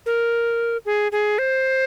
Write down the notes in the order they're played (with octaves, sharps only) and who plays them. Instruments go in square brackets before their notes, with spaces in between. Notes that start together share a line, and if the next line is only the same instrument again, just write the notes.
[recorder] A#4
G#4
G#4
C5